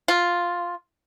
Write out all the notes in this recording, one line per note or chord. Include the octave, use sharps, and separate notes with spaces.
F4